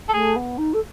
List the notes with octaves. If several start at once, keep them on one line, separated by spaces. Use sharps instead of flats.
A4
A3 G#4
B3
D#4
A4